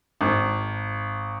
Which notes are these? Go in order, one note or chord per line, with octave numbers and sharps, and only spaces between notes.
G#1